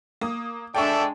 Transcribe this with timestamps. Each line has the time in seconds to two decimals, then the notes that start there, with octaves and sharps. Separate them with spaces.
0.21 A#3 D#6
0.75 G#3 D4 A4 D5 E5 G5 C#6